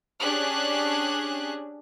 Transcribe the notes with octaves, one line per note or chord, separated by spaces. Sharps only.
C#4 D4 G4 G#4 F#6